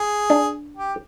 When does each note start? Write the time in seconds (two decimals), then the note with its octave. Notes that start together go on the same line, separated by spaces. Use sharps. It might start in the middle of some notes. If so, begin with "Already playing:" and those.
Already playing: G#4
0.30 D4
0.77 G4